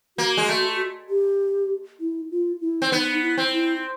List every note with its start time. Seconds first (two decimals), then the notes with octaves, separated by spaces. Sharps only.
0.18 A#3 F#4
0.37 G#3
0.49 A3
1.10 G4
2.00 E4
2.31 F4
2.61 E4
2.82 C4
2.92 B3 D#4
3.22 E4
3.37 C4
3.52 E4